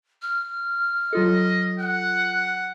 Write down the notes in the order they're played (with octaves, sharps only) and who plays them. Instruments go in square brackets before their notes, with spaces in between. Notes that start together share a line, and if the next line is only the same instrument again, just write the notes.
[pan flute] F6
[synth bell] F#3 F4 A4 [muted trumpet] D#5
[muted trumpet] F#5 [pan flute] F#6